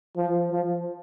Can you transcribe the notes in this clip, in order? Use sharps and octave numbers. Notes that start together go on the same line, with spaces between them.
F3
F3